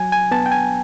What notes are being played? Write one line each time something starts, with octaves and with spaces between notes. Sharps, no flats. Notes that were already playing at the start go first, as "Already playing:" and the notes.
Already playing: F#3 G#5
G#5
B3 A5
G5
G#5